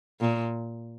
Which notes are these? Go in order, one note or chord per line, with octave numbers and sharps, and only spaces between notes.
A#2